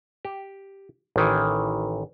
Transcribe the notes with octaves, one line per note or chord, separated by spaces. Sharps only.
G4
A1 D#3 E3